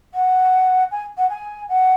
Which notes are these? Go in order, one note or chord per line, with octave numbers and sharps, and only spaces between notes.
F#5
G#5
F#5
G#5
F#5